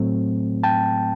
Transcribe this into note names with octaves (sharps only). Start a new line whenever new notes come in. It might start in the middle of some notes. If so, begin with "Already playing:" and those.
Already playing: A2 F#3 A3 C4
G5 A5